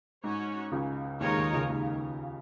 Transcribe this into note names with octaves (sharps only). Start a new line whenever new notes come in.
G#2 C#4 F#4 C#5
C#2 C#3
D#2 D#3 G#3 D#4 A#4 C#5
D#2 D#3
C#2 C#3
D#2 D#3